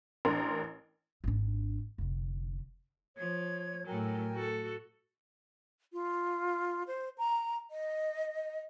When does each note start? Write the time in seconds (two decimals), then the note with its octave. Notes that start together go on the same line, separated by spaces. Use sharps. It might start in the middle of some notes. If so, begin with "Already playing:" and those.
0.25 A1 D4 A#4 C6
1.24 G#1 D4
1.98 F1 D3
3.17 F3 C#5 G#6
3.86 A2 F#3 A#4 G5 G#5
4.34 F#4 A4
5.93 F4
6.87 C5
7.18 A#5
7.71 D#5